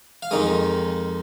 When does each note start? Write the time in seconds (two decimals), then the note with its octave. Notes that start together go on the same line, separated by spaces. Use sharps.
0.22 F5
0.31 F2 D#3 G#3 D#5